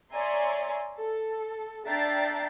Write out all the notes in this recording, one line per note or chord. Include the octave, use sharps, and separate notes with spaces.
C#5 D5 E5 G#5 A#5 C6
A4
D4 E5 G5 A#5 A6 C7